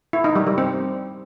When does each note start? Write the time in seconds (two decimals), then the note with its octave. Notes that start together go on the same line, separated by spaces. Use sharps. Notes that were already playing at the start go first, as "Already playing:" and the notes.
0.13 E4
0.24 D#4
0.36 G3
0.47 G3
0.58 C4